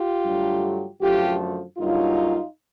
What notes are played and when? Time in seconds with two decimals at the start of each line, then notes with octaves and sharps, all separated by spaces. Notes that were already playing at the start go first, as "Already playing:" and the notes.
Already playing: F4 G4
0.25 G2 D3 F#3 A3
1.01 F#2 D3 F3 A3 F4 G4
1.78 G2 D3 F#3 A#3 C#4 D#4 F4